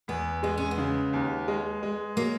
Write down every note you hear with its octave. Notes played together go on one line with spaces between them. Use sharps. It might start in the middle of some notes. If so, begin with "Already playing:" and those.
E2 B3
G#3 B3
C#4
B3
C#3
D#2
G#3
G#3
F#3 A#3